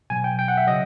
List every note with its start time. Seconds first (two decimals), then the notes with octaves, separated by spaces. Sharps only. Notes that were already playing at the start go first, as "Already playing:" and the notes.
0.10 B2 F#3 G#5
0.24 G5
0.39 G5
0.48 F#5
0.57 E5
0.67 C#3 F#3 D#5